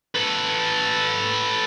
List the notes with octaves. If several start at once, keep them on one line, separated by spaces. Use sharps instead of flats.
A4 B4